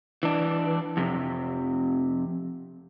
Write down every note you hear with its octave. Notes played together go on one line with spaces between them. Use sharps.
E3 D4
F2 C3